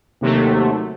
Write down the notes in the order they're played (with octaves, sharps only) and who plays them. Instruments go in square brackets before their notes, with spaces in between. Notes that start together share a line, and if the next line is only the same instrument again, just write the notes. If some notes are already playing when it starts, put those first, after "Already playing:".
[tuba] D#2 [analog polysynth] C3 F#3 A3